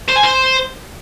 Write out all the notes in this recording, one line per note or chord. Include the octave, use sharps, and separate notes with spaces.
C5
G#5
C5